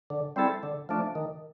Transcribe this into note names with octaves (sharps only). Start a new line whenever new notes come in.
D3
G3 C4 E4 A4
D3
F3 A3 D4
D#3